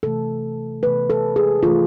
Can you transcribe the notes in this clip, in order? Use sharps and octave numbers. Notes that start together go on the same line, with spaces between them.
C3 E3 A3 A4
C3 E3 A3 B4
A4
G#4
C3 E3 A3 F4